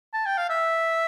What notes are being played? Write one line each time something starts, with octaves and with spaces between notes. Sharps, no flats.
A5
G5
F5
E5